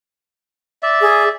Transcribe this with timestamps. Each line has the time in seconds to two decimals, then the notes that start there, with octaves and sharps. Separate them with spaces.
0.83 D5 E5
1.01 G#4